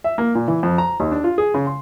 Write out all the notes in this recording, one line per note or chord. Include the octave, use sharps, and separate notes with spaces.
E5
A#3
A#2
E3
F2
A#5
D#2
D4
F4
G#4
C#3
C6